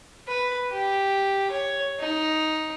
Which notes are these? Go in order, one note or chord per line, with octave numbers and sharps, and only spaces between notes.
B4
G4
C#5
D#4